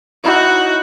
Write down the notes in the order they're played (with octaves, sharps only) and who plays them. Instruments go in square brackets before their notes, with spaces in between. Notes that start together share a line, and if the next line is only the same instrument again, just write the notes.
[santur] D#4 E4 C#5 [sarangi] F#4